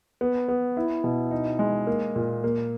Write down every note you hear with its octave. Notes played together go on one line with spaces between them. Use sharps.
B3
B3
E4
B2
D#4
G#3
A#3
A#2
A#3